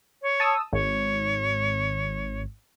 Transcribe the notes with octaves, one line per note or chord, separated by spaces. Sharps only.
C#5
A5 D#6 E6
G#1 C#5